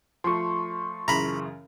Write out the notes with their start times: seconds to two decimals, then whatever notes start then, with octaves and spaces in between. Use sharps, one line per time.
0.24 F3 A3 C6 C#6
1.08 F#2 C#3 E3 A#5 B5